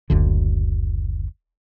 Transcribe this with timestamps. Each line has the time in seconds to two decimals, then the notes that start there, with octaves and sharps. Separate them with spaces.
0.10 F#1 D2 D3